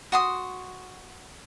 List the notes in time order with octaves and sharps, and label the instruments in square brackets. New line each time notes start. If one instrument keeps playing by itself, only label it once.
[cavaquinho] F#4 C6 D#6